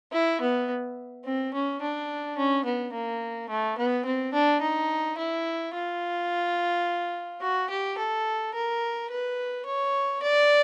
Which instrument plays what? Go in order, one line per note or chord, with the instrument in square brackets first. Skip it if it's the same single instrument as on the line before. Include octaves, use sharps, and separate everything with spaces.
[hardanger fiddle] E4
B3
C4
C#4
D4
C#4
B3
A#3
A3
B3
C4
D4
D#4
E4
F4
F#4
G4
A4
A#4
B4
C#5
D5